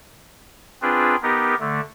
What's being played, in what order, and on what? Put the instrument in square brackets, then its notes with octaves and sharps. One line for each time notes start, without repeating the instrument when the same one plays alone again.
[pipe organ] C4 D4 F4 G#4 B4
B3 D#4 G4 A#4
D3 A3